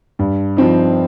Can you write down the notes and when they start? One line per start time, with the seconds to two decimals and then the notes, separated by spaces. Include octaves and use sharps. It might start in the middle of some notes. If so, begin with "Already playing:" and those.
0.19 G2
0.57 F3 C4 D#4